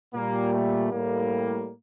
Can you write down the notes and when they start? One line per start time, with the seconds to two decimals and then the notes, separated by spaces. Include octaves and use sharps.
0.14 A#2 G3 A#3
0.53 A3
0.92 A2 G3 A#3